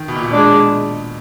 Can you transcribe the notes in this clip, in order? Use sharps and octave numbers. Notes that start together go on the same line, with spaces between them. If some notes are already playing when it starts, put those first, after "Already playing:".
Already playing: D#3
B2
A#2
B2
G#3 D4 G#4 D5